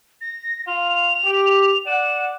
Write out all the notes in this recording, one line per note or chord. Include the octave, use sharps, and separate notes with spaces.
A#6
F4 F5 F7
G4
D5 F#5 E7